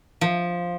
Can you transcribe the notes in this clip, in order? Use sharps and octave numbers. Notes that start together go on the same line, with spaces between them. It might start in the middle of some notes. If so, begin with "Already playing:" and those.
F3